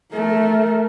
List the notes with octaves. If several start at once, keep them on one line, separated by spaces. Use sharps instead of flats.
A3 A#4